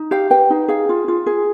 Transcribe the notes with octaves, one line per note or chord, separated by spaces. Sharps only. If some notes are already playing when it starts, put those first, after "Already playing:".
Already playing: D#4
G4 F5
B4 G5
D#4
G#4 F5
F4
F4
G#4